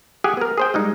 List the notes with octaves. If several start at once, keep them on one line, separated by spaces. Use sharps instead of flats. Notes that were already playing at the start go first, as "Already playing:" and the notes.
G4 G#4 F#5 G#5
B3 A#4
G#4 C5 G5
G3 G#3 D#4